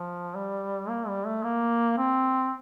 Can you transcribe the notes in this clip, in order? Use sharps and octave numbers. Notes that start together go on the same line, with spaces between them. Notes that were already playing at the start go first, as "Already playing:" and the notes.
Already playing: F3
G3
A#3
G3
A3
A#3
C4